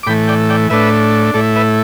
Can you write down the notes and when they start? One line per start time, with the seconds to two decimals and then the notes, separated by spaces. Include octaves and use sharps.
0.03 D6
0.06 A2 E3 A3 G5 B5
0.28 D5 G5
0.50 D5 G5
0.70 A2 A3 D4 B4 E5
1.34 A2 A3 E4 A4 D5
1.56 B4 E5